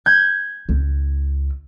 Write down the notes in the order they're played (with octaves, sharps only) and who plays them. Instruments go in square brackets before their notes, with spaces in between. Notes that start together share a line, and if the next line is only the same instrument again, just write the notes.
[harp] G6 G#6
[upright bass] C#2